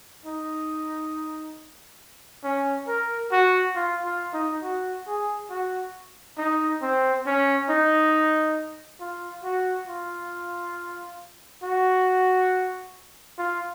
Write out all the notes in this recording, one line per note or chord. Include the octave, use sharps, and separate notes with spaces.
D#4
C#4
A#4
F#4
F4
F4
D#4
F#4
G#4
F#4
D#4
C4
C#4
D#4
F4
F#4
F4
F#4
F4